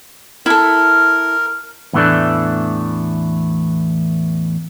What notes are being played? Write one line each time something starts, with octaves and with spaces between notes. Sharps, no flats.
E4 A4 A#4
E2 A2 E3 A3 D4